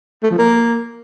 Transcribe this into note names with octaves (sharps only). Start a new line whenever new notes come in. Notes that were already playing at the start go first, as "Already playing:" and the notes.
A3
F3
A#3